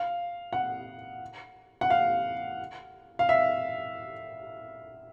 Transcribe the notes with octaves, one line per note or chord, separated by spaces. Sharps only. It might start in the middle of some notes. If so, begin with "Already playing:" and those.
Already playing: F5
F#5
F#5
F5
F5
E5